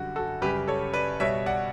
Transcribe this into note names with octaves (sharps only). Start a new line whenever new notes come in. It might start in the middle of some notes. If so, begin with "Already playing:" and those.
Already playing: F#2 D3 G3 F#4
F#4 A4
F#2 C#3 G3 G4 B4
A4 C#5
B4 D5
B2 G3 C#5 E5
D5 F#5